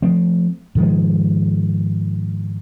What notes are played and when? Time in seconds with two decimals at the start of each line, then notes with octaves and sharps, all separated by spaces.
0.02 F3 A3 C4
0.75 G#2 D#3 F3 G#3